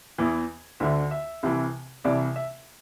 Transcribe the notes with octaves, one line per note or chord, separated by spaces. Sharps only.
E2 E3
D2 D3 E5
E5
C2 C3 E3
C2 C3 E3 D5
E5